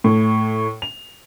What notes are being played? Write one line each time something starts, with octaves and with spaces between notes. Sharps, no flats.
A2
F7